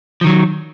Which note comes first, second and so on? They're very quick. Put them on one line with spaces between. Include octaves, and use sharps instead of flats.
F3 D#3 F#3